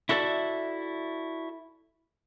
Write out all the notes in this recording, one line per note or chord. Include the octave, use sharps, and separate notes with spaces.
E4 F#4 A4 C#5 D5 E5